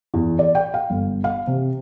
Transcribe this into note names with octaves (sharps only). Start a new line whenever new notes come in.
E2
D5
G5
F5
G1
F5
C3